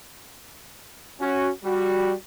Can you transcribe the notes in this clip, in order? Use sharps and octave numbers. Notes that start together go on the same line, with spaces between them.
C#4 F#4
G3 F#4